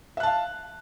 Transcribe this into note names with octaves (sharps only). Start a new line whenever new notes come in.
E5 F5 A5 F#6